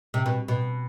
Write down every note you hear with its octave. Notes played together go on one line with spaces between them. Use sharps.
C3
B2
B2